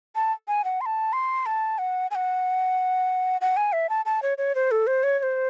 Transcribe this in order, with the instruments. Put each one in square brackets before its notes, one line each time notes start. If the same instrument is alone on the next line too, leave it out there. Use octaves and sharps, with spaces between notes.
[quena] A5
G#5
F#5
C6
A5
C6
A5
F#5
G#5
F#5
F#5
G#5
E5
A5
A5
C#5
C#5
C5
A4
C5
C#5
C#5
C5